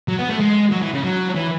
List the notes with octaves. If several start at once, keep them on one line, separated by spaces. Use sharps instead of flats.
F#3
B3
A3
G#3
F#3
E3
C#3
F#3
E3